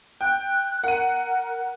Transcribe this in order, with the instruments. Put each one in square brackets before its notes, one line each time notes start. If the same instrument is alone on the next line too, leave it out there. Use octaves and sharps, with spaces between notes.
[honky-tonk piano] G5 [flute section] F#6
[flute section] A#4 [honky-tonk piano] F#5 D#7